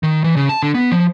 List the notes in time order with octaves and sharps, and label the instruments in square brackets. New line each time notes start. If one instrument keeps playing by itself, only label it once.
[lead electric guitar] D#3
E3
C#3
A5
D3
B3
F3